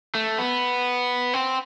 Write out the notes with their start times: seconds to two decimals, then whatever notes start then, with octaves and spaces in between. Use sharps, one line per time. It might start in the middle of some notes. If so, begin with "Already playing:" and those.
0.15 A3
0.38 B3
1.34 C4